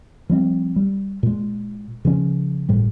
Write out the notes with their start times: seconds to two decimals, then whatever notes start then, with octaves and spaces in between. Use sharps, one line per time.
0.29 F3 G3 C4
0.76 G3
1.23 A#2 G#3
2.05 C#3 F3 C#4
2.69 G1 A2 G3